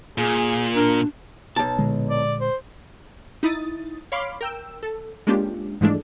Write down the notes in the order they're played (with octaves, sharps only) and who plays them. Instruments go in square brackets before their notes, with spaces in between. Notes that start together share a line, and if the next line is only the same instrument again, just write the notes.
[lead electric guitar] A#2 [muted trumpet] G#4
[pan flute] D4 [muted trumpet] A#4
[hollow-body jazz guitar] B1 A5
[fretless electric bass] A#2 D3 G#3
[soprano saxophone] D5
C5
[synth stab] D#4 E4 D#6 A6
C#5 F5 B5 C6 D6
A#4 G5 E6
A4
G#3 A#3 C#4 D4 F4 G4
G#2 E3 F3 G#3 A3 D4